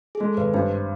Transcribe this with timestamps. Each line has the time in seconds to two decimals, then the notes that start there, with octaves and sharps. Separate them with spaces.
0.15 G#4
0.20 G#3 A4
0.37 G#1 B4
0.54 G2 C5